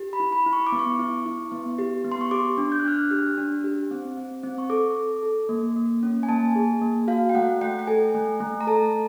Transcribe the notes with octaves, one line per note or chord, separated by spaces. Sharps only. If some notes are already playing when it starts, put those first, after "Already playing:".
Already playing: G4
B5
E4
B5
E4
C#6
D6
B3
C#6
E4
E4
B3
G4
B3
C6
C#6
G4 D6
D4
G6
F#6
D4 F6
F#6
G4 F6
D4
G4
C4
C4
C4
C#6
A4 D6
A4
A4
A#3
A#3
C#4
G#5
A#3 A5
G#4
A#3
F#4 F5
G5
A3 F#5
A3 G5
G5
A4 G#5
A3
A3
A#5
A4 A5